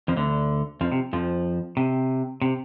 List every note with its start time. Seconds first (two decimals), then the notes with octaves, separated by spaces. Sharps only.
0.08 F2 F3
0.16 D2 D3
0.81 F2 F3
0.92 C3
1.13 F2 F3
1.77 C3
2.42 C3